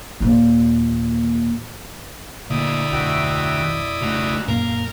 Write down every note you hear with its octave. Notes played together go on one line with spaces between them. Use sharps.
D#2 A#2
D2 A#2 E4 D5 D#5
B1 F2 F#4 E5 G5
C#3 A3 F#4
F#2 A#2 A#3 A#4 F5